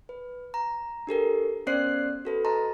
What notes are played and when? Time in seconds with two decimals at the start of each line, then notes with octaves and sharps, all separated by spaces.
0.09 B4
0.54 A#5
1.07 D4 G4 A4 A#4
1.67 B3 C#4 C5 D5 F#6 C7
2.25 F#4 A4 B4
2.45 D#5 A5 A#5 C6